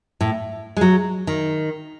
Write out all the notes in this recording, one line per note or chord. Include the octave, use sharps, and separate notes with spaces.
A2
G#3
F#3
D#3